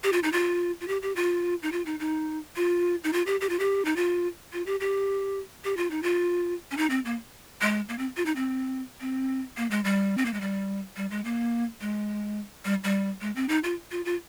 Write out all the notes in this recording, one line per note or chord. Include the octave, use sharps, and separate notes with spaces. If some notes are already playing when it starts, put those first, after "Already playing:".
G4
F4
D#4
F4
F4
G4
G4
F4
D#4
F4
D#4
D#4
F4
D#4
F4
G4
G4
F4
G4
D#4
F4
F4
G4
G4
G4
F4
D#4
F4
C#4
D#4
C4
A#3
G#3
A#3
C4
F4
D#4
C4
C4
A#3
G#3
G3
C4
A#3
G#3
G3
G3
G#3
A#3
G#3
G3
G3
G#3
C4
D#4
F4
F4
F4